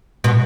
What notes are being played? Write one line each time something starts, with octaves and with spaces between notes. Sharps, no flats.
B2